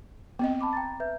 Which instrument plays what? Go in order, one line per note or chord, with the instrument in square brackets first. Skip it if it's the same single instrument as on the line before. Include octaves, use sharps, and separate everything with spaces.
[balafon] B3 C4 D#5
[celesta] A5 B5 D6
G5 A#5 A6
B4 E5 G6